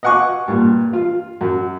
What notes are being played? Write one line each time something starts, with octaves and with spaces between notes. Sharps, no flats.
D#5 F5 F#5 G#5 C#6 D6
G2 A#2
F4 F5
F#2